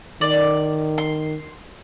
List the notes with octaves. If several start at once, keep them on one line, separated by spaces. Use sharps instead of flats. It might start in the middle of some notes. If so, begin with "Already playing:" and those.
D#3 D5
C6